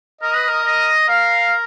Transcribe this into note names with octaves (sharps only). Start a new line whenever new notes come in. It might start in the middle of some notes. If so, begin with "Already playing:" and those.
A#4 D#5
B4
A#4
D#5
A#4 F5